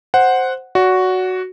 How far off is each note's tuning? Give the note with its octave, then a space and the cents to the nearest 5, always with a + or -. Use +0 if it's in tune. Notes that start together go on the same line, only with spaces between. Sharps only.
C5 +0 F#5 +0
F#4 +0 D5 -40